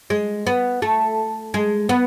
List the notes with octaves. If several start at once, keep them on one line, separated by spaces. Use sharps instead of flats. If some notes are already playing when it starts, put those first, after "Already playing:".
G#3
B3
A3
G#3
B3